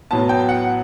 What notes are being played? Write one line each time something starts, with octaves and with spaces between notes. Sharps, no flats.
A2 F#3 B3 A5
G5
F#5